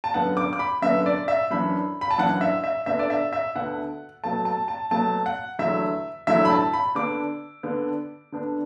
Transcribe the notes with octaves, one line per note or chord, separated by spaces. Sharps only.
A5
F#2 D3 B3 D4 F#5
D6
D6
B5
F#2 D3 B3 D4 E5
D5
E5
F#2 E3 D4 B5
B5
A5
F#2 E3 D4 F#5
E5
E5
D2 D3 B3 D4 E5
D5
E5
E5
D2 D3 B3 D4 F#5
B2 F#3 A3 A5
A5
A5
B2 F#3 A3 A5
F#5
E2 D3 F#3 A3 E4 E5
E2 D3 F#3 A3 E4 E5
B5
A5
B5
D3 B3 D4 D6
D3 B3 D4
D3 B3 D4